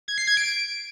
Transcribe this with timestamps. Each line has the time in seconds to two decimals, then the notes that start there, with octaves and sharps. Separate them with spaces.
0.08 G#6
0.18 C7
0.27 G#6
0.37 D7